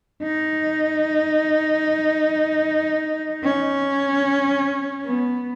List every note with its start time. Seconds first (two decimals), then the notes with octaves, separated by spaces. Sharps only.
0.23 D#4
3.44 C#4
5.06 B3